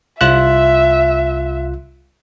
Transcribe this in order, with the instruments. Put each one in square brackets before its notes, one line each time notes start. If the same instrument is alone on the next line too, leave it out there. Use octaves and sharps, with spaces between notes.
[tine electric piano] C2 F4 F#6 [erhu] E5